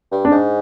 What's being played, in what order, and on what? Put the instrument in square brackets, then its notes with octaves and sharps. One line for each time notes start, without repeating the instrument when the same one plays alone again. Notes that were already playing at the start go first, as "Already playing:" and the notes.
[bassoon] G2
[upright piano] D4
[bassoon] G#2